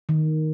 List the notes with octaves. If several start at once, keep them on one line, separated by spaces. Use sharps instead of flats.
D#3